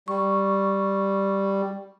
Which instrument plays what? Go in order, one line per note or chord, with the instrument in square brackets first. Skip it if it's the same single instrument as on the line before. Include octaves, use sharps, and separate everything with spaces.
[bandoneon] G3 [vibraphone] C#6